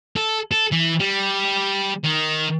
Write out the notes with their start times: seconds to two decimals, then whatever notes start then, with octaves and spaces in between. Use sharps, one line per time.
0.16 A4
0.51 A4
0.72 E3
1.00 G3
2.04 D#3